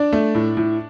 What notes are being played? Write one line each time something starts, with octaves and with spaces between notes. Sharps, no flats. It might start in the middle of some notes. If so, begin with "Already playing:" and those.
Already playing: D4 D5
A3
A2
A2